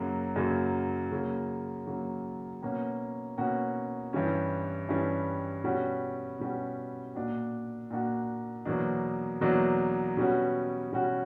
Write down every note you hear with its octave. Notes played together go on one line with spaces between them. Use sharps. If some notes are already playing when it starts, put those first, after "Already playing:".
Already playing: F#2 C#3 F#3 A#3
F#2 C#3 F#3 A#3
C#3 F#3 A#3
C#3 F#3 A#3
B2 A#3 C#4 F#4
B2 A#3 C#4 F#4
G2 E3 G3 C#4
G2 E3 G3 C#4
B2 G3 C#4 F#4
B2 G3 C#4 F#4
A#2 A#3 D4 F#4
A#2 A#3 D4 F#4
E2 B2 F#3 A#3 D4
E2 B2 F#3 A#3 D4
B2 G3 C#4 F#4
B2 G3 C#4 F#4